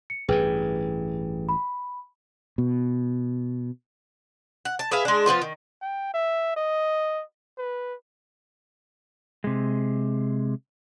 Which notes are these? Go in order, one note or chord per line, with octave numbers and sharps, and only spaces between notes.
C#7
A1 G2 E3 G#4 B4 G5
B5
B2
F#5
A5
G#4 B4 E5 F5
G#3 D4
F3 G#3 B3 F4
D#3
G5
E5
D#5
B4
C3 G#3